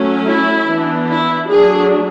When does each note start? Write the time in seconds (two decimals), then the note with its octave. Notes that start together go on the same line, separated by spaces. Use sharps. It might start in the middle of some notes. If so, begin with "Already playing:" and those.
Already playing: F#3 A3 C#4
0.27 E4
0.68 E3 B3 D4
1.09 E4
1.49 F#3 A3 D4 G#4